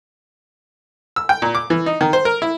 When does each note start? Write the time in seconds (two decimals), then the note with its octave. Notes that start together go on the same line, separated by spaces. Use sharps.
1.16 E6
1.29 G5
1.42 A#2
1.55 D6
1.70 E3
1.86 D#4
2.01 D#3
2.13 C5
2.25 A#4
2.42 E4